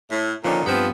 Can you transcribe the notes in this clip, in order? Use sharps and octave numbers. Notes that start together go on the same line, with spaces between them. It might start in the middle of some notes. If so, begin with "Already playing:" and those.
A2
A#2 D3 D#3 F3 C#4 D5
G2 F3 B3 C4